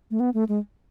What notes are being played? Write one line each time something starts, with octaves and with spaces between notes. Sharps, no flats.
A3
B3
A3
G#3